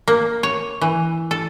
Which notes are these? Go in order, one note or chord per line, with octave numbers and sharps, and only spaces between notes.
A#3
C#5
E3
A4